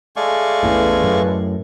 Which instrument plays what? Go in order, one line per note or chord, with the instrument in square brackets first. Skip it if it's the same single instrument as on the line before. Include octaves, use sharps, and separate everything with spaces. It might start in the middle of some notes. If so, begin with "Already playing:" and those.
[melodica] G#3 A3 C#6 [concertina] D5 F5 G#5
[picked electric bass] A1 E2 A2 [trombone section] B4
[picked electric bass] F#2 A2